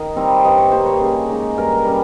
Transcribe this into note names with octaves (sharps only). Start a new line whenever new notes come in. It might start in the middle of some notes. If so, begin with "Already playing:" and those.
Already playing: D#3 A#4 D#5
G3 C4 D#4
G2 D#5
C#5
G3 A#3 C5
C#5
C#3
G#3 D#4
G2 A#4
G3 C#4